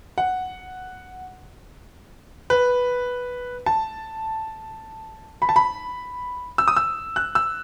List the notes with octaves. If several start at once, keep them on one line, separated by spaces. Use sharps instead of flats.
F#5
B4
A5
B5
A5
B5
E6
D#6
E6
F#6
E6